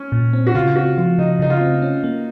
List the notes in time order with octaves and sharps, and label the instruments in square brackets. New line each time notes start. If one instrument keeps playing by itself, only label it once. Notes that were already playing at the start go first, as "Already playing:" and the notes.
Already playing: [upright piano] C#4
[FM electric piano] A#2
C4
[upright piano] F#4
[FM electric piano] C#3 [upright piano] F4
[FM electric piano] C4 [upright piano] F#4
[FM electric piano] F3 [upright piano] F4
[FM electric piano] C#3 [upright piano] D#4
[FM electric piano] C#3 [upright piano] D#4
[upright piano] F4
[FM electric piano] C4
C#4
A#3